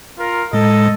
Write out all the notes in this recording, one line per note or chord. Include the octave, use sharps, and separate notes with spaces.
F4 A#4
A2 G#3 A4 D#5